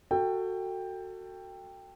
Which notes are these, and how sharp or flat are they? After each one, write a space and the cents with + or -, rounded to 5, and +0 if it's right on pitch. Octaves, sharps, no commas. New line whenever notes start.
F#4 +0 A4 +25 G5 +10